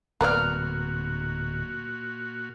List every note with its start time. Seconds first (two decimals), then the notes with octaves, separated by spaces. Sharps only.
0.21 D1 A#2 A#3 B3 F#4 D5 A#5 F6